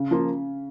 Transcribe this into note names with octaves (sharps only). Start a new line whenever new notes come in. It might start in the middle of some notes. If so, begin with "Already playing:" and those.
Already playing: C#3
F3 A#3 F4